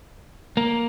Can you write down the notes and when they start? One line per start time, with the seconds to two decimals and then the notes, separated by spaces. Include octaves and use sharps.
0.57 A#3